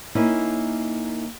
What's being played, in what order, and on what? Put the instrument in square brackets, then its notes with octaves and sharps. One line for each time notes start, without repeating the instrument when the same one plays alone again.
[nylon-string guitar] A#3 C#4 D#4 E4